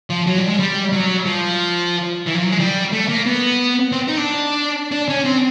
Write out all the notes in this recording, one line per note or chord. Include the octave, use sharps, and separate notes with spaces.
F3
F#3
G3
G#3
G3
F#3
F3
E3
F3
F#3
G#3
G3
A3
A#3
B3
C4
D#4
D4
D4
C#4
C4